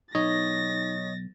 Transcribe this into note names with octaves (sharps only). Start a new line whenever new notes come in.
B1 D#4 C#5 D#5 A6 A#6